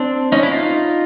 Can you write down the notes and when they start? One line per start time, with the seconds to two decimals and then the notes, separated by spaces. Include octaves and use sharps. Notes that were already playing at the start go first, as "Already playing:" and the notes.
Already playing: C4 D4
0.32 C#4 D#4
0.43 D4 E4
0.51 D#4 F4